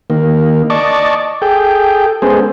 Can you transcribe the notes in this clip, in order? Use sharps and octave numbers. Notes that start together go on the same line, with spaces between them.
D#3 A#3
D5 D#5 A5 C#6 D6
G#4 A4 G5
G#3 B3 C#4 G#4 A4 C5